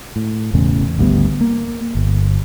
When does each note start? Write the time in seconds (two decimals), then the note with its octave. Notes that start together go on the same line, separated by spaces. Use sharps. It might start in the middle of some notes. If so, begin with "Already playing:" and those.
0.16 A2
0.53 E1 E2 A2 C#3
0.98 G#1 D2 G3 B3
1.41 A#3
1.95 G1